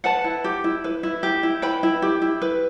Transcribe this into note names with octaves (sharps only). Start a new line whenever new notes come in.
B4 F#5 A5
E4
G4
E4
B4
E4
G4
E4
B4 G5 B5
E4
G4
E4
B4